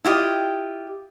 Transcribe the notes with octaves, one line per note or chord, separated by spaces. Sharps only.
E4 F4 G4 D#5